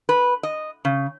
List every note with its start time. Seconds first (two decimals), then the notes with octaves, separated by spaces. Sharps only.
0.09 B4
0.43 D#5
0.85 C#3